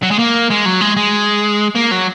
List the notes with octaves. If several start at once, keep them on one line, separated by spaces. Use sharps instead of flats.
F#3
G#3
A#3
G#3
F#3
G#3
G#3
A#3
F#3